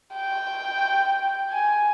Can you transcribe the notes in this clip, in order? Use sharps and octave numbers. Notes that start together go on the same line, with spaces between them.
G5
G#5